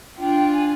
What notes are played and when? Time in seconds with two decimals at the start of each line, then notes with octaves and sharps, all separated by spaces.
0.18 D4 F4 G5
0.52 G#5